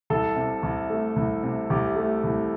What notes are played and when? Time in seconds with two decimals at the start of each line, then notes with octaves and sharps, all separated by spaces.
0.10 C2 A4
0.36 C3
0.63 C2
0.90 A3
1.16 C2
1.43 C3
1.70 C2 G4
1.96 A3
2.24 C2